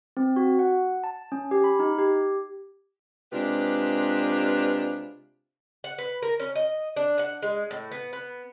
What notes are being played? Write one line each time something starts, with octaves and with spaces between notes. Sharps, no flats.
C4
F#4
F#5
A5
C#4
G4
B5
D#4
G4
C3 G#3 D4 F4 G4 B4
F#5
B4
A#4
C#4
D#5
D4
F#5
G#3
A2
B3
B3